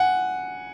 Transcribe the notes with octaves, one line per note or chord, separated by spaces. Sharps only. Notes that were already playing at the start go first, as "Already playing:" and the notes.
Already playing: F#5 G#5